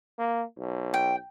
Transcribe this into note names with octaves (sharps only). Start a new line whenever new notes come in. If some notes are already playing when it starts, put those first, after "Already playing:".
A#3
B1
G5